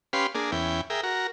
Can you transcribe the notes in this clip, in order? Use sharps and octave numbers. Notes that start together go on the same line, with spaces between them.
C#4 G4 B4 F5 C6
A#3 D4 G#4
E2 C#4 E4 G5
G#4 A#4 E5 G5
F#4 A#4